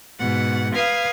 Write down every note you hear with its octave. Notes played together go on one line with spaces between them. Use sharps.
G#2 B2 F#5
B4 F5 D#6 G#6